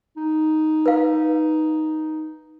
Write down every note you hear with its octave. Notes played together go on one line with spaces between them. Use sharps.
D#4
B4 F5